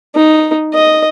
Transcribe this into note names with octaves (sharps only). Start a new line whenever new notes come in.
D#4
D#5